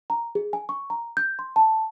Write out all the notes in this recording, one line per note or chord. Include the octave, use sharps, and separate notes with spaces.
A#5
G#4
G#5
C#6
A#5
G6
C6
A5